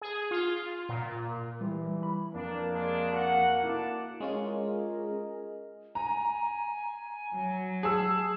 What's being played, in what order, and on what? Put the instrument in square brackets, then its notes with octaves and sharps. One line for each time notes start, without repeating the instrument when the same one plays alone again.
[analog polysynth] G#4
F4
A#2
[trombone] E3 [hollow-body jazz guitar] G3
[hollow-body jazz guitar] B5
[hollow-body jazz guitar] F2 [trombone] A#3 [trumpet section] D4
[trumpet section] G#3 D4
F#4 F#5
[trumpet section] D4 D5 A5 [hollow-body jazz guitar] E4 F#4 A4
[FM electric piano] G#3 C#4 F4 [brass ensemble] G#4 A#4 D#5
[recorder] G#5 [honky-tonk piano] A#5
[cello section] F#3
[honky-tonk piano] G#4 E6 [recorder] A5